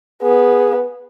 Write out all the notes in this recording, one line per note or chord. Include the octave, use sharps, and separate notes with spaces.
B3 G#4